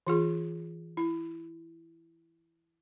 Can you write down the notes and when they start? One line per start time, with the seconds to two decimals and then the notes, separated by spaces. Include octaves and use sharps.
0.07 E3 F4 G#4
0.97 E4